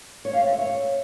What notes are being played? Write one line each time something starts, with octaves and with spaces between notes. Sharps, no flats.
C#5
F5
C5
E5
C#5